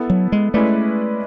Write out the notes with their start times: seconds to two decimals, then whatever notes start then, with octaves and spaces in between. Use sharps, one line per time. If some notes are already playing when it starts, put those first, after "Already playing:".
Already playing: B3 E4 A4
0.10 F#3
0.32 G#3
0.54 G#3 A3 C#4 E4 B4 D5